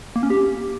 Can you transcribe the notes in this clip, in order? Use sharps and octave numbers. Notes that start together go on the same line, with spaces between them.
A#3
C#4
G4